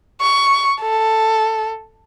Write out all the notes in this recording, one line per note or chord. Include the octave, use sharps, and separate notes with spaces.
C#6
A4